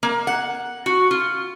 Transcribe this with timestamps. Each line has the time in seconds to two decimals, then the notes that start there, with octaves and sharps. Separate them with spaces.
0.03 A#3
0.27 F#5
0.86 F#4
1.11 F4